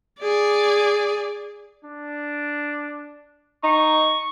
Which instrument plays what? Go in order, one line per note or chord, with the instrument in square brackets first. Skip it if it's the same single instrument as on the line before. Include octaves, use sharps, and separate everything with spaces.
[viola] G#4 D5
[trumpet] D4
[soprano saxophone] D#4 [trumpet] C#6